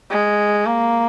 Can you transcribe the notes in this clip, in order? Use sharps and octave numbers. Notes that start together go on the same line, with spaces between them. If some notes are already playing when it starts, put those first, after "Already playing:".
G#3
A#3